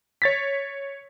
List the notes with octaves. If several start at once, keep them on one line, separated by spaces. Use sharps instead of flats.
C#5 A6 B6